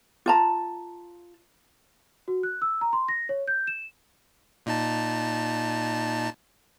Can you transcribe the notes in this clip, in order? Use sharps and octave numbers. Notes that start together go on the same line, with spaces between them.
F4 A5 A#5
F#4
F#6
E6
A#5
C6
A#6
C#5
G6
E7
A#2 D#4 A5